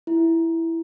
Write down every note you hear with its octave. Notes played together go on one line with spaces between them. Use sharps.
E4